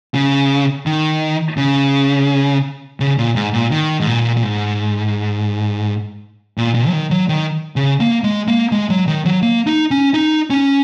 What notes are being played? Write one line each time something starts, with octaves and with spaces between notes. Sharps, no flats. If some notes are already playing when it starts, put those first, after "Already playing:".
C#3
D#3
C#3
C#3
A#2
G#2
A#2
D#3
G#2
A#2
A#2
G#2
A#2
A#2
F#3
D#3
F#3
D#3
C#3
A#3
G#3
A#3
G#3
F#3
D#3
F#3
A#3
D#4
C#4
D#4
C#4